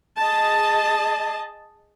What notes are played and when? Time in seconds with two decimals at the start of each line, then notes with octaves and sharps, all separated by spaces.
0.19 G#4 D#5 A5